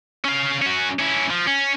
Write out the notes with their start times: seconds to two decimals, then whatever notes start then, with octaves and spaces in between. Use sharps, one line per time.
0.24 C#4 F5
0.62 C#4 F#4
0.99 C#4 E4
1.30 F3
1.47 C#4